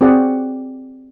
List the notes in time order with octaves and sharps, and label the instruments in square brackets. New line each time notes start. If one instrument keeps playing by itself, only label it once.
[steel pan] C4 F#4 G#4 D5 F#5